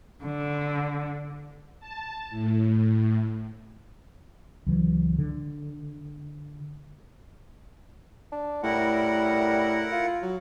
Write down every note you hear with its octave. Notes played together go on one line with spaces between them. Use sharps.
D3
A5
A2
C#2 E3 F#3
D3
D4
A2 G3 E4 A#4 F#5
F4
F#3